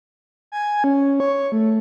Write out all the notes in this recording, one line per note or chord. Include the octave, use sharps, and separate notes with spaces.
G#5
C#4
C#5
A3